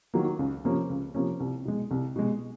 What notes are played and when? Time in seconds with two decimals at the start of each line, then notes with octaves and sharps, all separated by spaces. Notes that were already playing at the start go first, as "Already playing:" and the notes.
0.14 D#3 F#3 A#3
0.39 C#2
0.65 C3 F3 A#3 C#4
0.90 C#2
1.14 C3 F3 A#3 C#4
1.40 C2
1.65 B2 G#3
1.91 C2
2.16 B2 G#3